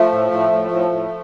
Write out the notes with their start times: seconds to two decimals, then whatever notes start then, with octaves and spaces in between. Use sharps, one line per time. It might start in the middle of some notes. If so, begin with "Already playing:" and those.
Already playing: F3 A3
0.12 A2
0.32 A2
0.51 A2
0.71 A2
0.91 A2